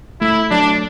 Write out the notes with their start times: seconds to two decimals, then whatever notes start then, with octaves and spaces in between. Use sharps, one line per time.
0.21 A3 E4
0.51 F#3 D4